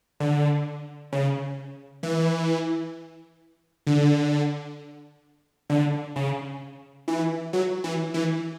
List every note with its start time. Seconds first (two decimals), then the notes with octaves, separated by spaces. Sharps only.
0.20 D3
1.13 C#3
2.03 E3
3.87 D3
5.70 D3
6.16 C#3
7.08 E3
7.53 F#3
7.84 E3
8.14 E3